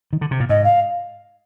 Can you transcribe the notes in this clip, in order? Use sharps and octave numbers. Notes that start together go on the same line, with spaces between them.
D#3
D3
C3
A#2
G#2 D#5
F5